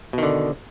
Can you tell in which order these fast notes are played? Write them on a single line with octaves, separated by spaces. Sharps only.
B2 D#3 D3